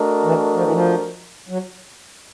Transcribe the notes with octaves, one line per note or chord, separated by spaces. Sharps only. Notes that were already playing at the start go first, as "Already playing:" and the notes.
Already playing: A3 D4 F#4 A#4 D#5
E3
F3
E3
F3
F#3